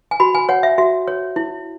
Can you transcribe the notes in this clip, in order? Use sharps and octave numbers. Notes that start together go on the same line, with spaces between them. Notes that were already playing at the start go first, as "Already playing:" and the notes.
G#5
F#4 B5
G#5
C#5 F#5
E5
F#4 E5
C#5
E4